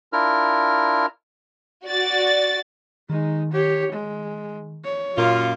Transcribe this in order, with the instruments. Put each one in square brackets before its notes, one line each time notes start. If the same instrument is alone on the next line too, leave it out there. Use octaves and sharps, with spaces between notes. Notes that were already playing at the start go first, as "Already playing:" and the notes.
[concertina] D4 E4 F4 A#4 F6
[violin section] F#4 D5 A6
[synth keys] D#3 [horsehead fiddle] G#3 D#4
[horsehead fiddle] G4 C#5
G#3
C#5
[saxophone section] F#2 A#3 F4 [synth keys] A#2 C#4 D#5